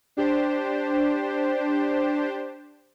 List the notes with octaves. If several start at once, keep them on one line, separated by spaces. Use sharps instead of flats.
D4 G4 C5